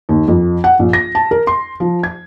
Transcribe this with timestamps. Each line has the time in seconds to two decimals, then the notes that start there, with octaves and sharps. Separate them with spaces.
0.09 D#2
0.28 F2
0.64 F#5
0.79 A#1
0.93 A#6
1.15 A5
1.31 A#4
1.47 C6
1.80 F3
2.03 G#6